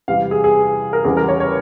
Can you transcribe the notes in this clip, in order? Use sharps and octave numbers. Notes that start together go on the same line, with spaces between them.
E2 C3 G3 F5
G#4
G#4
A#4
E2 C#3 G3 G#4
A#4
C#5
C#5